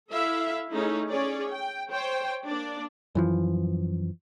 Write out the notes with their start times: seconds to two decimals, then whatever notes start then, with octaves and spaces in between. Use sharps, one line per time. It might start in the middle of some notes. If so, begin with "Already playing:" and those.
0.11 E4 A4 E5 F5
0.73 A3 C#4 D#4 E4 G#4 C#5
1.10 C#4 G#4 C#5 D5
1.50 G5
1.92 C5 C#5 G5
2.46 A#3 D4 D5
3.15 F#2 E3 F3